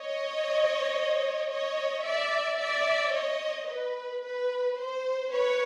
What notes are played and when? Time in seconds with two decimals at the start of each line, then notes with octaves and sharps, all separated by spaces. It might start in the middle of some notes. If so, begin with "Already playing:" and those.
Already playing: C#5 D#5
1.50 C#5 D#5
2.05 D5 E5
2.60 D5 E5
3.13 C#5 D#5
3.69 B4
4.23 B4
4.78 C5
5.31 B4 C#5